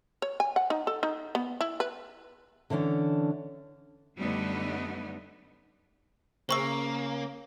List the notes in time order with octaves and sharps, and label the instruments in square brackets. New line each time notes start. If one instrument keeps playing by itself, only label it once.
[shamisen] C#5
G#5
F#5
D#4
A4
D#4
B3
E4
B4
[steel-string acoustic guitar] D3 E3 C#4 D4
[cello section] F#2 D3 G3 A3 B3 D#4
[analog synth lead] C#3 [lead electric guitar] A#3 [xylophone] C5 C#6 E6